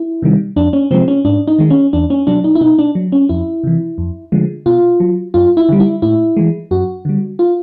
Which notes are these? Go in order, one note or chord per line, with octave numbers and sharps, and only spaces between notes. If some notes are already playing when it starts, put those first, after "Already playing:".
Already playing: E4
C3 D#3 G3
F2 D4
C#4
C3 F3 G#3 C4
C#4
G#2 D4
D#4
D#3 G#3
C#4
E2 D4
C#4
B2 F#3 D4
D#4
E4
B2 D#4
D4
F#3
C#4
F2 E4
C3 E3
F2
D3 F3 G#3
B2 F4
F#3
F#2 F4
E4
D3 G3
E4
A2 E4
E3 G#3
F#2 F#4
D3 G3
F4